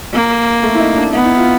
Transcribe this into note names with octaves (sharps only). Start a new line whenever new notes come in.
A#3
A3
E4
D#4
D4
B3 D#4
E4
F4